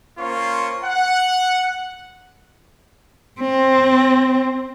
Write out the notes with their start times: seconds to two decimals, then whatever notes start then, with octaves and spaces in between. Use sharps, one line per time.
0.18 A#3 C#4 F4 C5 C6 C#6
0.85 F#5
3.41 C4